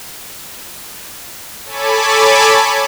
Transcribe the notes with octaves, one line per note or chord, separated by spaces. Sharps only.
A4 C#5 G#5 A5 B5 D6